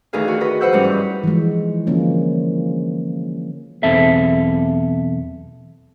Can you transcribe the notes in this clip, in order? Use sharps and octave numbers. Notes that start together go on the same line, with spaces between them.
D2 D#3 E3 D#4 G#4 F5
F#4
D#4 F#4 B4 D#5
F3 B4 C5 F#5 E6 G6
G#2 E3 G3 C#4 D#4
G2
E3 F3 G#3
D3 F3 A#3 C#4
B1 E2 C4 A4 E5